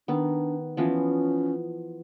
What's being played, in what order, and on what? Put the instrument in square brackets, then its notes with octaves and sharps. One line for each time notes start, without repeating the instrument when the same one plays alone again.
[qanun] D#3 B3 [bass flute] D4
[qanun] E3 F3 B3 [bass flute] C#4